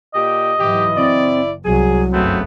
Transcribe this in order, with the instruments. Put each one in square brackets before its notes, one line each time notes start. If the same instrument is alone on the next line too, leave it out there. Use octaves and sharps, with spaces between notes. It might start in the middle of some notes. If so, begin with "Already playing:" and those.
[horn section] A#2 G4 [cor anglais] D#5
[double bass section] G#2 E3 F#3 [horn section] G4
[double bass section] F#1 [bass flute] C4 [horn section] E4 D5
[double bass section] C2 [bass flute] F#3 [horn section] G#4
[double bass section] F#1 G2 [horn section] C#3 A3 B3 [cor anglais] C4